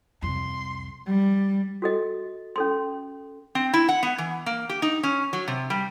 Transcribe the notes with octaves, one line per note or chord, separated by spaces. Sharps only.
C2 F2 C6
G3
F#4 A4 D#5
C#4 A4 C6
C4
E4
F#5
B3
E3
A#3
G4
D#4
C#4
F#3
C3
G3